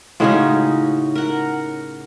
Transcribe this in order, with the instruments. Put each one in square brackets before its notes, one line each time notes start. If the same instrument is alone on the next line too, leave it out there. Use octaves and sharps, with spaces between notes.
[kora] A2 C#3 G#3 [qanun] C#4 D#4 F#4
[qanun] A#4 F#5